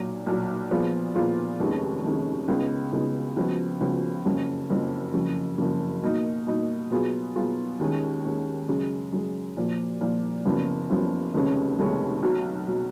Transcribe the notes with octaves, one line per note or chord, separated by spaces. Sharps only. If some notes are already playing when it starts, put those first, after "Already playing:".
Already playing: B1 A#2 F#3
B1 A#2 F#3
A#2 F3 B3 F4 G#4
A#2 F3 B3 F4 G#4
F1 D#2 D#3 G#3 C#4
F1 D#2 D#3 G#3 C#4
C#2 C#3 G#3 B3 D#4
C#2 C#3 G#3 B3 D#4
C#2 C#3 F3 B3 F#4
C#2 C#3 F3 B3 F#4
F#1 F2 C#3 F3
F#1 F2 C#3 F3
F#1 F2 C#3
F#1 F2 C#3
B2 A#3 D#4
B2 A#3 D#4
B2 F#3 B3 F4 G#4
B2 F#3 B3 F4 G#4
D#2 D#3 G#3 C#4
D#2 D#3 G#3 C#4
F#2 C#3 G#3
F#2 C#3 G#3
A#2 F3 A#3
A#2 F3 A#3
F#1 F#2 C#3 F3 B3
F#1 F#2 C#3 F3 B3
F1 D#2 C#3 G#3 C#4
F1 D#2 C#3 G#3 C#4
B1 B2 F#3
B2 F#3